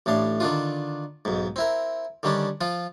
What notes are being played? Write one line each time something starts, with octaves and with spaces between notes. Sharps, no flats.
A1 A2 D4 F5
D3 D#3 D4 F4
B1 G#2
C4 E4 A#4
D3 D#3 G3 C#4 D4
F3 F4